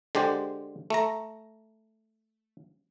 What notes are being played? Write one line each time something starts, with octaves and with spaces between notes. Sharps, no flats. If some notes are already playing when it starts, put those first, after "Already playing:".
D3 G#3 G4 C5
A3 A#5